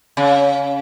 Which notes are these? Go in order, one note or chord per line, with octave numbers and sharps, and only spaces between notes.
C#3